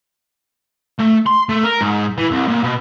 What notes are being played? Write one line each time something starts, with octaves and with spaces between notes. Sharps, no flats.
A3
C6
A3
A#4
G#2
E3
C2
A#2
B2